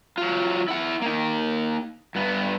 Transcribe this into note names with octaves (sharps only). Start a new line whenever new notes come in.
F#3 F4
E4 F#5
A#3 D#4
G2 B3